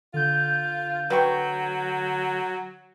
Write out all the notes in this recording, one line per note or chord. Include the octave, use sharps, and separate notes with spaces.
D3 F4 G6
F#3 B4 G5 C#6